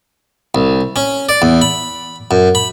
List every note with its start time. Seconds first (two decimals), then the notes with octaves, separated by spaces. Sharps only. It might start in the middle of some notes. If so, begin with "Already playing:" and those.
0.55 C2
0.96 C#4
1.29 D5
1.42 E2
1.62 B5
2.31 F#2
2.55 B5